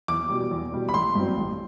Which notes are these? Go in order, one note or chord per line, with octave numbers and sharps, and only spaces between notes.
E2 D6
B2 G3
E2
B2 G3
B5
A1 C6
G2 F#3 C4
A1